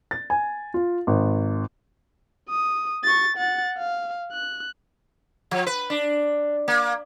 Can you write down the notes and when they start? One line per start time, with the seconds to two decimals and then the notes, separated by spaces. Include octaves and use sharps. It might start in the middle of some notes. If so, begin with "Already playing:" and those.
0.11 A6
0.30 G#5
0.74 F4
1.07 G#1
2.49 D#6
3.04 C#6 A6
3.37 F#5 A6
3.78 F5
4.32 F#6
5.51 F3
5.66 B4
5.90 D4
6.68 A#3